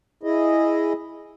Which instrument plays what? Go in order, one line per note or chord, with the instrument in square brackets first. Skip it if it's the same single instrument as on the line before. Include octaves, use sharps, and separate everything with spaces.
[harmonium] E4 G#4 D#5